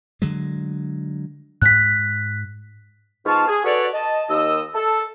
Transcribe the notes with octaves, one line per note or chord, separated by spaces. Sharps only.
D3 F#3 G#3
G#2 F#6 B6
G#2 B3 F4 F5 A5 C#6
G#4
F#4 A4 B4 C#5 D5
D#5 A5
D#2 D#5 E6
A4